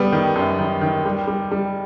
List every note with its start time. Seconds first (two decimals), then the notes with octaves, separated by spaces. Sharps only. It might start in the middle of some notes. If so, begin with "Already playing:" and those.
Already playing: G3 B3
0.12 D#3
0.36 F#2
0.59 D#3
0.81 D#3
1.05 G3
1.27 G3
1.52 G3